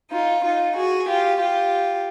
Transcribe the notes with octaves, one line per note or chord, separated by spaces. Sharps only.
D#4 F4
D#4 F4
F#4 G#4
F4 G4
F4 G4